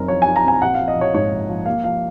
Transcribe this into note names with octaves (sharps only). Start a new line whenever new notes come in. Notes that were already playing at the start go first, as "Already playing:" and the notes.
Already playing: F#2 C4 D#4 A#4
F3 C#5
D#4 G#5
A#5
C4 G#5
A#1 F#5
F3 F5
D#5
A#1
C#5
G#2 C#5
A#1
F3
A#3 F5
F3 F5